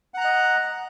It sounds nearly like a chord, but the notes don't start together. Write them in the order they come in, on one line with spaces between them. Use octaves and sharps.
F#5 A#5 F#6 D#5